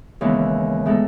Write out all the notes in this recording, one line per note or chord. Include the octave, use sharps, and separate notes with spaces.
D#2 C#3 E3 G#3 B3
A2 G#3 B3 D#4 A4